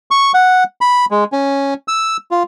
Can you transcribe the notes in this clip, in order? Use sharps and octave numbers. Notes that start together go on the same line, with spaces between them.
C#6
F#5
B5
G#3
C#4
E6
F4